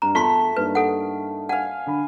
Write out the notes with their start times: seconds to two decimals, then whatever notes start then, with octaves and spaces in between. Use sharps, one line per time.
0.02 G2 A#5
0.15 E2 A3 F4 C6 B6 G7
0.56 G2 A#3 D#4 B4
0.75 A4 F#5
1.49 F5 F#5 G#5
1.86 D3 B5